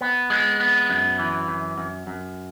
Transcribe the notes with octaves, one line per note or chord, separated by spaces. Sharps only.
B3
G#3
B3
F#2
E3
F#2
F#2
F#2